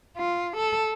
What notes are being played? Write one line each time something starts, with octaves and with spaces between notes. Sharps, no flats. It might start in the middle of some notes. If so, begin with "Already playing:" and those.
F4
A4